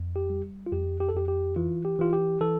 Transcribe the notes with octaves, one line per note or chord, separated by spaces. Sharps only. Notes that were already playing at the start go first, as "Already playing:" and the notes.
Already playing: F2
G4
G3
F4
F2 G4
G4
A4
F2 G4
G4
E3 F4
G4
E3 F4
G4
E3 A4